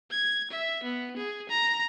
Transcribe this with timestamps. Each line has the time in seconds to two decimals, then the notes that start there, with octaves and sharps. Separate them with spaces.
0.11 G#6
0.51 E5
0.83 B3
1.17 G#4
1.49 A#5